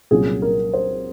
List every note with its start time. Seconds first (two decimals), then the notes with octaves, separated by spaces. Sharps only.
0.11 C2 A#2 F#3 C#4 F4 G#4
0.42 A#4
0.74 C5